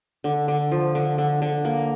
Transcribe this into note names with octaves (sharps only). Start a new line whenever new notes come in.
D3
D3
F3
D3
D3
D3
A#3